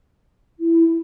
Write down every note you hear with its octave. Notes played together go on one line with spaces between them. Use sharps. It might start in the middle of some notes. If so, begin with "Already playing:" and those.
E4